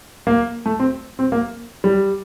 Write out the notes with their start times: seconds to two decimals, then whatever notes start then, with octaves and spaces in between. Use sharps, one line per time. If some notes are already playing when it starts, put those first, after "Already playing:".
0.27 A#3
0.66 A3
0.79 C4
1.19 C4
1.32 A#3
1.84 G3